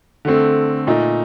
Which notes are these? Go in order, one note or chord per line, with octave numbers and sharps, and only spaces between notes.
D3 A3 C4
A#2 A3 D#4